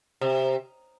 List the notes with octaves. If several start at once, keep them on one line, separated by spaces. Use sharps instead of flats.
C3